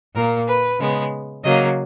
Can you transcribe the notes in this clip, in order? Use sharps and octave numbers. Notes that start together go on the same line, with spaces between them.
A#2 A#3 A#4
B4
C#3 G#3 B3
C#3 F#3 A#3 D#5